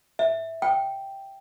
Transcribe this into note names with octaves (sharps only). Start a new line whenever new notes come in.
E5
G5